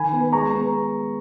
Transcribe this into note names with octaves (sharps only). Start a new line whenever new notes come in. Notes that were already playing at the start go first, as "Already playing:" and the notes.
Already playing: D#3 G#5 B5
B3
G#3 A#5 C#6
B3